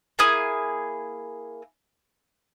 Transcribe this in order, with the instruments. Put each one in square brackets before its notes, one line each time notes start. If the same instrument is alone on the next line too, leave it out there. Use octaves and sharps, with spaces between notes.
[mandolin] A#3 E4 G#4 D#6